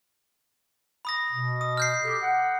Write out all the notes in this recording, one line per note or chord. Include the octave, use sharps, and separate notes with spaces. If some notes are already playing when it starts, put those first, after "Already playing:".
B5 D#6 A#6
B2
D#6
F6 G6 C7
G4 A4
F#5